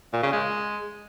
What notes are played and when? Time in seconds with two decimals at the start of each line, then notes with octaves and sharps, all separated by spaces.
0.13 A#2
0.23 C#3
0.33 G#3